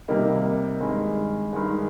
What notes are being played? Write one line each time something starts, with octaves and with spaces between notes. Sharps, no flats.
C3 G3 A#3 D#4
G2 D#3 G#3
G2 D#3 G#3